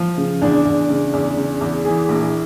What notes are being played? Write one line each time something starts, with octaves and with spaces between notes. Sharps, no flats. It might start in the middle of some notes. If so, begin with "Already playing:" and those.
Already playing: F3
C#3
E2 D4
E2
C#3
E2
C#3
E2
E3 G#4
A#1